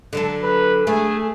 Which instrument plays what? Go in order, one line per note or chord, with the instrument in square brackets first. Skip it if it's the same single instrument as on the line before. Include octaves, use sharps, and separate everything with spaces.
[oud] D3 F#3 A4
[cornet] B4
[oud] A3 [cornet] G#4